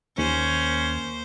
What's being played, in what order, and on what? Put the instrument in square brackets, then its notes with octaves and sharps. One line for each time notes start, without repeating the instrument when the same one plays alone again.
[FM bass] D#2 [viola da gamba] A#3 C5 [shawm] C#4